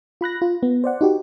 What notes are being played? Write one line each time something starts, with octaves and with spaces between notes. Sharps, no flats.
F4 B5 F#6 A#6
F4
B3
C5 D5 F#5
D#4 F#4 G4